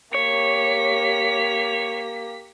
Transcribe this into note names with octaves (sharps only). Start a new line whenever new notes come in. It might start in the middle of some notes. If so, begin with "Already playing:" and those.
A#3 G4 C#5 B6